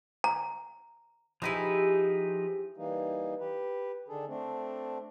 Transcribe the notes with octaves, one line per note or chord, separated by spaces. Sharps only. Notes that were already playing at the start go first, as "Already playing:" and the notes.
A#5
F3 D#4 E4 G4 G#4 B4
E3 G3 A#3 D#4
G4 B4
D3 D#3 D4 G#4 A4
A3 C4 D4